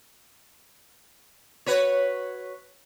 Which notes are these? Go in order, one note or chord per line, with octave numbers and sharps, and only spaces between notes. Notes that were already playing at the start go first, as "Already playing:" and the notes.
F#4 B4 C#5